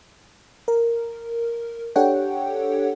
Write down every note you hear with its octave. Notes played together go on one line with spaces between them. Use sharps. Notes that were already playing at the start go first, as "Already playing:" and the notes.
A#4
D4 G4 A4 C#5 F#5 G5